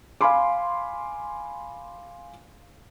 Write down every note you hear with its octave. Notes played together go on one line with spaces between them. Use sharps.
F5 G#5 B5 C6 D6